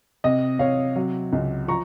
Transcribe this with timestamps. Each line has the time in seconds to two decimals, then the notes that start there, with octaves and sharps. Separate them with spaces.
0.24 C3 D#5
0.59 C3 C#5 F5
0.96 F#3
1.33 C#2
1.68 F3 A#5 C#6